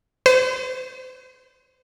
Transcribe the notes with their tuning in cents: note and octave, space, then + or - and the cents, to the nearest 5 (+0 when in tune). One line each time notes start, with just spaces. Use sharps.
C5 -45